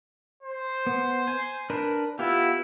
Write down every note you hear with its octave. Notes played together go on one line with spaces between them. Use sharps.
C5
B3
G#5
D4 A#4 B4
B3 E4 F4 G4